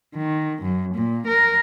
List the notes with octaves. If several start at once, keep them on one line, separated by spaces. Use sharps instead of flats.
D#3
F#2
A#2
A#4